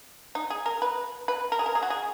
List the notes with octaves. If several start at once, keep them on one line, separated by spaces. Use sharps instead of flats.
D#4
G#4
A#4
B4
B4
A#4
G#4
A#4
G#4
F#4
G#4